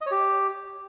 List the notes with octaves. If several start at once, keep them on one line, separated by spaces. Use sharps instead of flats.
D#5
C#5
G4